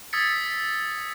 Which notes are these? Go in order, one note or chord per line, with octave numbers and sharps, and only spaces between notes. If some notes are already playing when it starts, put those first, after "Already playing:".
D#6 E6 G#6 A6 B6 C#7